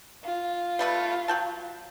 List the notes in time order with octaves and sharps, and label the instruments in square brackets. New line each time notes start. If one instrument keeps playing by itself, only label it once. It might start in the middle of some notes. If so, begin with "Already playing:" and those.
[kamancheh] F4
[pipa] G3 A3 B3
F#3 G5 A5